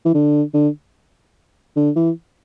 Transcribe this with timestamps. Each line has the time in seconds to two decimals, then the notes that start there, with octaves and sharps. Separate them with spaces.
0.05 E3
0.14 D3
0.54 D3
1.76 D3
1.96 E3